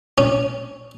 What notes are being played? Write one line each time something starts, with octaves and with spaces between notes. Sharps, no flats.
C#4